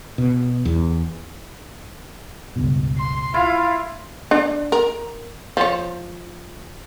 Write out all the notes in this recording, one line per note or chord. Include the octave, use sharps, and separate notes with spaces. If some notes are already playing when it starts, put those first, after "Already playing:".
B2
E2
C#2 G2 B2
C6
E4 F4 F5
D4
A#4
F3 C#5